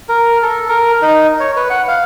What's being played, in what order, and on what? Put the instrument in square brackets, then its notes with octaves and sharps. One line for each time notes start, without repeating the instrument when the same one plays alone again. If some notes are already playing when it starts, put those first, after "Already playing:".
[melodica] A#4
A4
A#4
D#4
C#5
B4
F#5
F5